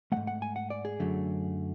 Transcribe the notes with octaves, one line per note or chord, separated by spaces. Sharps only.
G#2 F#3 A3 F#5
F#5
G#5
F#5
D5
G#4
F#2 D3 F#3 A3